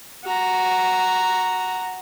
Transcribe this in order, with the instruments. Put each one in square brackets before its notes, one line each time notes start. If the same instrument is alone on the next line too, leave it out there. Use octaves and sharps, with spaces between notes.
[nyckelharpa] F#4 A#5